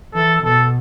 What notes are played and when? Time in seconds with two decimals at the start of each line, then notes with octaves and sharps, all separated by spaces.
0.14 E3 A4
0.43 B2 A4